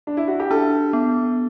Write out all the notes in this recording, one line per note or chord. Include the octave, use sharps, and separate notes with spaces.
D4
E4
F#4
G4
D4 A4
B3